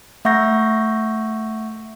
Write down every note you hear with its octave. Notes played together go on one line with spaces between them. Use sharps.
A3 E5 F#5 C#6 G6 A#6